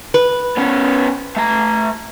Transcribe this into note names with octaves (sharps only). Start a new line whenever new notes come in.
B4
B3 C#4
A3 A#5